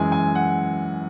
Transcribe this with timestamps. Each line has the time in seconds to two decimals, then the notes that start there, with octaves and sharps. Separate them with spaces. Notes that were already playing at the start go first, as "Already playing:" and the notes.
Already playing: F#2 E3 G#3 G#5
0.12 G#5
0.35 F#5